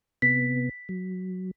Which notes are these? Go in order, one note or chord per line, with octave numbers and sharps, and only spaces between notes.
C3 B3 B6
F#3